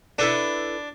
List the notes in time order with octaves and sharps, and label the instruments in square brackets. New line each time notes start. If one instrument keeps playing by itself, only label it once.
[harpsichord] D4 [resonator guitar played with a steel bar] E4 A4 B4